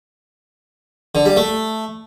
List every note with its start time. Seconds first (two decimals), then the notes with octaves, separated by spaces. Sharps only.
1.15 D3
1.26 G3
1.36 A3